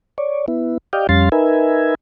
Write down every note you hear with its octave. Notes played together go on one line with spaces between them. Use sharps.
C#5 D5
B3 E4
G4 D5 D#5 F5 G5
F2 G3 C#4 F5 C6 A6
D#4 A#4 B4 E5 G#5